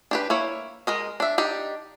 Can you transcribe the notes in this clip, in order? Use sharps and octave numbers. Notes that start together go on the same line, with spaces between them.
D4 G4 B4
A#3 E4 C#5
G#3 A#4 D#5
D4 E5
D4 D#4 G4